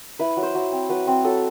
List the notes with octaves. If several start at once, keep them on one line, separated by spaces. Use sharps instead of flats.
E4 B4
F#3
C5
F#3
C4
F#3 B4
C4
F#3 A4